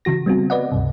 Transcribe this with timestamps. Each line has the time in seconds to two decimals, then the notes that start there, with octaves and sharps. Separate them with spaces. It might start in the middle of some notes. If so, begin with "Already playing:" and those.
0.05 C#3 E3 F#4 A#6
0.26 G3 B3 C4 F#4
0.50 B4 D5 D#5 F#5
0.72 C#2 G2 C3